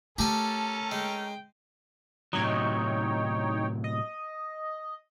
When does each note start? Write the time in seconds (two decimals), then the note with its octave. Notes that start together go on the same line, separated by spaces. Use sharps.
0.18 A3 C#4 G4 A4 A#4 G#5 A5
0.92 G#3 G5
2.33 A2 C3 F#3 D#4 C#5 G5
3.84 D#5